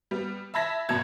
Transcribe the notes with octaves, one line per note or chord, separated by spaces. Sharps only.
G3 B3
E5 A5 B5 G#6 A#6 B6
G#1 F#2 B2 A5 G#6